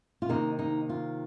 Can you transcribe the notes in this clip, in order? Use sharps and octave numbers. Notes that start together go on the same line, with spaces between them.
F4
C3 D#3 A#3 D#4
D#4
F4